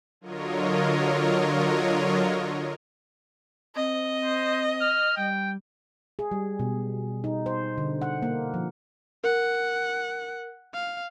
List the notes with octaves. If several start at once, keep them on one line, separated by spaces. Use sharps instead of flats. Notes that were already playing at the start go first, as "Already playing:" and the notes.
D3 F#3 F4 A#4 C#5 D#5
C4 D#5
C5
F6
G3 G5
G#4
G3
B2
D#4
C5
D3
F#5
A#3
F3
A#4 F#5
F5